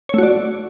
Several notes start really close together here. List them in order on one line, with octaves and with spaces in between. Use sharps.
C#5 A3 F#4 D5